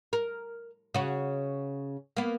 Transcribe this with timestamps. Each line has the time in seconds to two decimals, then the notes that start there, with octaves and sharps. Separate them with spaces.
0.13 A#4
0.94 C#3 F#4
2.17 A#3 B3